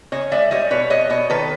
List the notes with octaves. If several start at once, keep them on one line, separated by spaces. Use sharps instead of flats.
C#3 C#5 D#5
G#3 D5 E5
G3 C#5 D#5
B2 B4 C#5
G3 C#5 D#5
B2 C#5 D#5
D#3 A4 B4